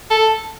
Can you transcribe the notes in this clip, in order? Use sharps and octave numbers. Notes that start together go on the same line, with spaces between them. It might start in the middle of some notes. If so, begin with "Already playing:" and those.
A4